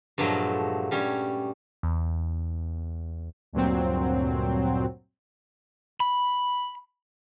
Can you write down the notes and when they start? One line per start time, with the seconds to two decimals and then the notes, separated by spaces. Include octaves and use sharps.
0.18 G2 A#2 F3 F#3 G#3 A3
0.91 G2 G3 C#4
1.83 E2
3.53 D2 G2 A#2 F#3 C4
6.00 B5